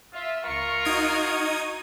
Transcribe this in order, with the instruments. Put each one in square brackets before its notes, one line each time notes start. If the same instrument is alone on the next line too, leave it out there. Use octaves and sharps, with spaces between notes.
[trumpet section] F4 [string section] E5
[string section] C#2 C#6 C#7 [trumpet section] F4 A#4
[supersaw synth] D#4 D#6 G#6 [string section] F#4